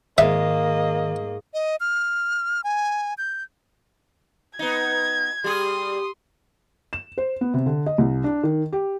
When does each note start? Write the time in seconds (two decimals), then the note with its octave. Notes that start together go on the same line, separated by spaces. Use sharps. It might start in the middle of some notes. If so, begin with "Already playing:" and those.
0.18 G#2 D#3 A#3 D#5 E5
1.54 D#5
1.80 F6
2.64 G#5
3.18 G6
4.59 B3 D#4 G#6
5.44 G3 G4 G#4 C6 D#6
6.93 E7
7.18 C5
7.41 B3
7.54 C3
7.66 D3
7.86 D#5
7.98 C2
8.24 D4
8.43 D#3
8.73 G4